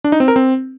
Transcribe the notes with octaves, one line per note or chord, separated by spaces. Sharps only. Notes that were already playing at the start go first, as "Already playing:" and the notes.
D4
D#4
C4
A#4
C4